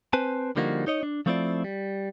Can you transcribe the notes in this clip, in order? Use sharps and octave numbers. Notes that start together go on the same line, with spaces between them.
C4 B4 C5 G#5 A5
D3 F3 G3 A#3 D#4 F#4
D#4 C#5 D#5
D4
F3 A3 C4 E4 F4 D5
G3